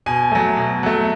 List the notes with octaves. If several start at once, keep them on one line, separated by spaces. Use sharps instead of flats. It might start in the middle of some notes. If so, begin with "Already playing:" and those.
B2 G#5
F#3 A3
B2
F#3 A3